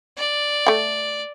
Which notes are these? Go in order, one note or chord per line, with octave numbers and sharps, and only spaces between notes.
D5
A3 G5